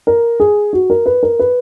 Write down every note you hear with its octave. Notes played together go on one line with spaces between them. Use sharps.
A#4
G#4
F#4
A#4
B4
A#4
B4